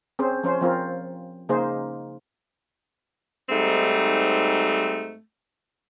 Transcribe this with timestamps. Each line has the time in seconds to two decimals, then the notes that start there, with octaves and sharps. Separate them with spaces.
0.19 C4 C#4 G#4 C5
0.43 F3 C#4 C5
0.61 F3 C4 F4 A#4
1.49 C#3 A#3 D#4 G#4 C5
3.49 G#2 G3 A3 C4 D#4